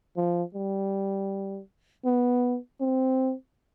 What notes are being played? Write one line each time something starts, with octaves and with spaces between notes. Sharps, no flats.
F3
G3
B3
C4